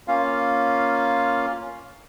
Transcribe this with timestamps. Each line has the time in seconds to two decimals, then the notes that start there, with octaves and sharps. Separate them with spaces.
0.08 A#3 C#4 F4 F5